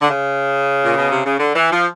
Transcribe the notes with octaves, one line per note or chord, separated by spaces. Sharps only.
D3
C#3
A#2
B2
C3
C#3
D3
E3
F3